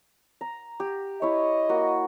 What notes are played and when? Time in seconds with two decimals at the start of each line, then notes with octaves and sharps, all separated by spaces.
0.41 A#5
0.80 G4
1.22 E4 C#5 D#5
1.69 A#3 F#4